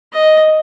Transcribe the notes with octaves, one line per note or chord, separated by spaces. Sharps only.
D#5